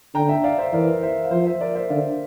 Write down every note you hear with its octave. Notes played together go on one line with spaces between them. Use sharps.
D3 G5 A#5
E5 G5
D5 F5
C5 E5
E3 A#4 D5
C5 E5
F5
F3 C5 E5
C5 E5
A#4 D5
C5 E5
D3 D5 F5